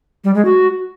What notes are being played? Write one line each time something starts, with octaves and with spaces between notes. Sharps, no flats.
G3
G#3
F#4